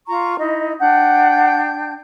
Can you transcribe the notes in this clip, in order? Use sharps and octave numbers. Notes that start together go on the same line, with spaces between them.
F4 A#5 C#6
D#4 E4 D#5
D4 F#5 G5 G6